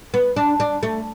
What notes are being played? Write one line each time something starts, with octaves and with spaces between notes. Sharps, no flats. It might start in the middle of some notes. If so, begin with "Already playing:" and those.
B3
D4
D4
A3